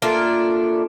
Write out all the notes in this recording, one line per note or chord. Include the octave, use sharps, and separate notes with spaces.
A3 A#3 D4 F4